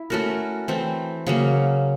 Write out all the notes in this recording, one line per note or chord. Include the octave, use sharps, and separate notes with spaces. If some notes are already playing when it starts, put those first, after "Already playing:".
Already playing: E4
A3 C#4 F#4 A#4
E3 A3 C4
C#3 F#3 A#3